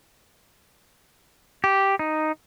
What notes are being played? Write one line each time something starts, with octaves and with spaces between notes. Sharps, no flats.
G4
D#4